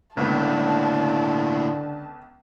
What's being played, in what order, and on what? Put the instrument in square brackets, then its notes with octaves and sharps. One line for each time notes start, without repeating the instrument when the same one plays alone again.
[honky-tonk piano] C#2 B3 [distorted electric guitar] A2 A#3 [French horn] D3 [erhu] A5